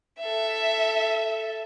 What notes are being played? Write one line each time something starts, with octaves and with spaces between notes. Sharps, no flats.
A4 E5